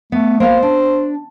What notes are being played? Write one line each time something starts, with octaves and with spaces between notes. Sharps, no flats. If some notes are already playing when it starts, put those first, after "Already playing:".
A3 B3
A#3 C5 F5
D4